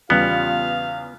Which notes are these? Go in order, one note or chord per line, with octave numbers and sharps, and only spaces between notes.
E2 C#3 G3 B3 F4 F5